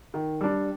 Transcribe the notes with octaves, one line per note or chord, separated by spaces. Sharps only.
D#3
G3 D4